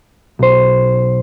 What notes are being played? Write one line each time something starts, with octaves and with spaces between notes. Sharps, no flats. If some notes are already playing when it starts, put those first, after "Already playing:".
B1 C5